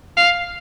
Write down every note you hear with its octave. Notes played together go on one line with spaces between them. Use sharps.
F5